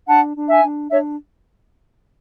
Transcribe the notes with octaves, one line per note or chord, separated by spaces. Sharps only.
D4 F#5 A5
D4
E5 G#5
D4
D4 C#5 E5